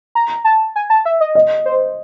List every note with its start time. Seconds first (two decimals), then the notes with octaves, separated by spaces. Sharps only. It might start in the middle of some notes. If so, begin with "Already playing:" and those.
0.15 A#5
0.45 A5
0.76 G#5
0.90 A5
1.05 E5
1.21 D#5
1.35 D#5
1.65 C5